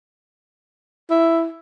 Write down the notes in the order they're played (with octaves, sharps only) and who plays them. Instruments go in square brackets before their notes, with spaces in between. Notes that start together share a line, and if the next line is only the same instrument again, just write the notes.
[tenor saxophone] E4